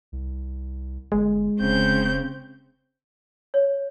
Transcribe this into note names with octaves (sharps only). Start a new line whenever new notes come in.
C2
G1 G#3
F1 C#3 C4 G6
C#5